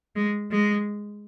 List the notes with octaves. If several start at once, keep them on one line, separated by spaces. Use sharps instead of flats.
G#3
G#3